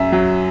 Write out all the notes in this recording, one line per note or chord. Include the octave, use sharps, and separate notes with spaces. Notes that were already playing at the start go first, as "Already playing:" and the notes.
Already playing: F#2 E5
F#3